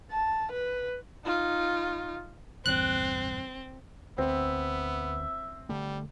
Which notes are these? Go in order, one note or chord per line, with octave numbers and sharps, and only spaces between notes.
A5
B4
D#4 F4
A#1 E2 G2 C4 F#6
D2 B3 C4 E5
D3 G3 A3